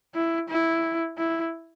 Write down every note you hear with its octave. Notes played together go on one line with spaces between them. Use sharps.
E4
E4
E4